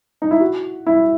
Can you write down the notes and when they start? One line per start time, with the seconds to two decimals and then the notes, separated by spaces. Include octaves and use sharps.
0.22 D#4
0.31 E4
0.40 F#4
0.86 E4